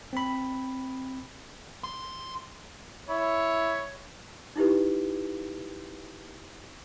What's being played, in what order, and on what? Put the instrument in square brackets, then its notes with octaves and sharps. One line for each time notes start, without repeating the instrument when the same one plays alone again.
[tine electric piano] C4 B5
[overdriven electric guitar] C6
[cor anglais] E4 [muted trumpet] C#5
[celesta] D#4 E4 G4 B4